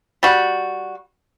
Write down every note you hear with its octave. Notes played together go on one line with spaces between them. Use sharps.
G3 F#4